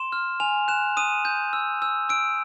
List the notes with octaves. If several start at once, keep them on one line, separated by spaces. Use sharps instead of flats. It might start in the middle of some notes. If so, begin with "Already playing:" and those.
Already playing: C6 E7
F6
G#5 F7
F#6 E7
D#6 D#7
G6
E6
E6
E6 D7